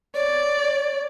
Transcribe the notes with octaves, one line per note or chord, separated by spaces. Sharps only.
C#5 D5